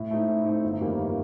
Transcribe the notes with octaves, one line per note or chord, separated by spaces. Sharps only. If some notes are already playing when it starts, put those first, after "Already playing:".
Already playing: A2
A3 C4 D#4
A2
A3 C4 D#4
G1
F2 D#3 G3 A#3